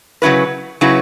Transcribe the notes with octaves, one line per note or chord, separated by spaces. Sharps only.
C#3 F#3 C#4 E4 B4
C#3 F#3 C#4 E4 B4